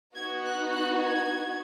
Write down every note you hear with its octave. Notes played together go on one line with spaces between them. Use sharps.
B3 D#4 F#4 G#6
F#6
F#6
G#6